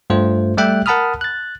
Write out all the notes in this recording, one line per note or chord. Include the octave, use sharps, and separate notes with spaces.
G2 A3 F4 C5
G3 A3 G4 E5 G5 F#6
A#4 F#5 A5 B5 D#6 F6
F#6 A6